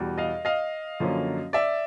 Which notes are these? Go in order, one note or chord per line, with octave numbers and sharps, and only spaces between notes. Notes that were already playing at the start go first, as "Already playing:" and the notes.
Already playing: E2 B2 G3
D#5 F5
D#5 F5
F#2 D3 F3 A#3 C#4
D5 E5